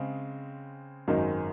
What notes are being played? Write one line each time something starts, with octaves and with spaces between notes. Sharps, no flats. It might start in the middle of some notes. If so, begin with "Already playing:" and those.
Already playing: C#3 G#3 C4
G#1 F#2 D#3 G#3 D#4